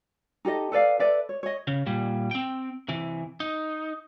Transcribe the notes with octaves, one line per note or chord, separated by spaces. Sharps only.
D#4 G4 A4 D#5
A4 B4 D5 F5
A4 B4 D5 E5
C#5
C#5 D#5
C#3
A#2 G3
C4 G5
C3 E3
D#4